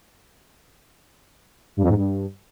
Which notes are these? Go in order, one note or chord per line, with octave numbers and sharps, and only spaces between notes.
G2
F2
G#2
G2